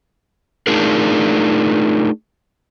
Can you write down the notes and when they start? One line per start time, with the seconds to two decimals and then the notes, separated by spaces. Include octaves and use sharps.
0.67 A3 D4 D#4 F4 G#4 A#4